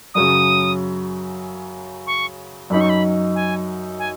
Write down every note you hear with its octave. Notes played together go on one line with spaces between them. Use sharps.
F#2 C#3 F#3 D#6
C#6
F#2 F#3 D#4 B5
C#6
B5
G#5
G#5